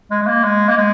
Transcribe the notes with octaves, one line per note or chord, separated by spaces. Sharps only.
G#3
G#3
A#3
G#3
A#3
G#3